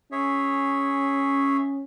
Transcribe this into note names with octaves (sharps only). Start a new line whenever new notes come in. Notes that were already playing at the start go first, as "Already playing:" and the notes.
C#4 G#4 C#5 E5